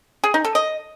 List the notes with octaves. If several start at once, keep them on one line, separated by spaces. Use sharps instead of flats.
G#4
D#4
A4
D#5